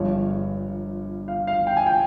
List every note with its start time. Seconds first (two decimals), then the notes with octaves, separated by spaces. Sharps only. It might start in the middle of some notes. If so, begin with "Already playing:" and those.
Already playing: G1 G2 F3 G#3 C#5
1.28 F5
1.47 F5
1.67 G5
1.77 G#5
1.86 G5